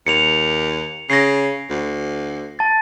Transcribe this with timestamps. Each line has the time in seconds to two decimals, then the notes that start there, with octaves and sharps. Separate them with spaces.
0.07 D#2 C#7 F7
1.10 C#3 A#6 C7
1.70 D2
2.59 A5 A6